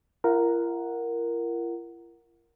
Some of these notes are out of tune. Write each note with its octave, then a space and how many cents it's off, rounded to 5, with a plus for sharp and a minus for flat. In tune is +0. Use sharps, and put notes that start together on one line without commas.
F4 -45 A#4 +0 F#5 +0